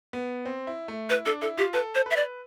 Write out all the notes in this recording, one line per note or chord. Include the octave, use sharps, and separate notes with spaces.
B3
C4
E4
A3
E4 B4
D4 A4
E4 A4
F4 G4
A4 B4
C5
B4 E5
D5